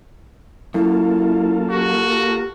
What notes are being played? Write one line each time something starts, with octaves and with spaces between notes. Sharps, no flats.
F#2 A#3 E4 F4 A4
F#4 G4